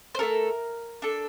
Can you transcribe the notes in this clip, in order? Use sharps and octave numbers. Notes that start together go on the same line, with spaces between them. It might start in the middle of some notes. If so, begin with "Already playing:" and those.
C5
A3 D4 A4 A#4
D4 A4